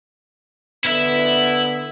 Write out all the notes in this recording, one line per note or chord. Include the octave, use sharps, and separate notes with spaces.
D3 B3 E4 E5